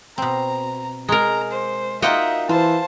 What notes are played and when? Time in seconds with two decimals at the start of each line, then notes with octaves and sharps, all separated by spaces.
0.18 B2 C4 A#5
1.09 G#3 A#4 A#5
1.51 C5
2.02 A#3 D#4 F4 F#4 D#5 E5 F#5 G5
2.49 E3 F4 C5 A5